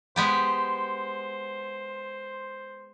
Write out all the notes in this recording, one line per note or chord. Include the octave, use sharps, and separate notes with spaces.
G#3 B3 G4 C5